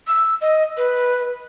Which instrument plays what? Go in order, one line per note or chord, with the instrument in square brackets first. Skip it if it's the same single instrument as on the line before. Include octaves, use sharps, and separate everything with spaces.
[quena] E6
D#5
B4